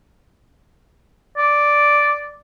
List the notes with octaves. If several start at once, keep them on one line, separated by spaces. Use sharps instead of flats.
D5